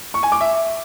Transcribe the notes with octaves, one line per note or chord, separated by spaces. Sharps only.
C#6
G#5
D6
E5